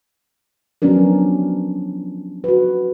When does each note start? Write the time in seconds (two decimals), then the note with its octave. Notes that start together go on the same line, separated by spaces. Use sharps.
0.82 F3 F#3 B3 C#4 D4 A#4
2.44 F#4 B4